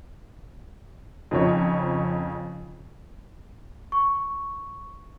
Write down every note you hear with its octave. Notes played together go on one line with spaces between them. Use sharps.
F2 C#3 F3 D#4 C#5
C#6